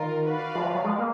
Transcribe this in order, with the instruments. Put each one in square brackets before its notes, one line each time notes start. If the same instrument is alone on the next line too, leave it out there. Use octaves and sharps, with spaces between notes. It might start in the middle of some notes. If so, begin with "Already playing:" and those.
Already playing: [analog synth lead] D#3 [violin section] F4 A#4
[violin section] F#4 B4 D5 F5
[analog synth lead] F3
F3
F#3
G#3
A#3